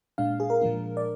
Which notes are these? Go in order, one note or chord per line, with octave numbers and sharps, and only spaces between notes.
A#2 G#3 D4 F5
G#4
A#4
A#2 F3 G#3 D4
D5